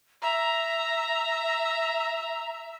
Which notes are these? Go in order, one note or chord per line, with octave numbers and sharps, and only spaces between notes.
E5 A#5